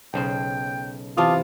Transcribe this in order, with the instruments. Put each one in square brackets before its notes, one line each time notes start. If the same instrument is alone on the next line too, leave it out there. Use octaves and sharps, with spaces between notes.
[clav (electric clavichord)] B1 C#3 C5 [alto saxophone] G5
[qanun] C3 E3 F5 [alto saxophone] F4 [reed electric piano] A5 D6 D#6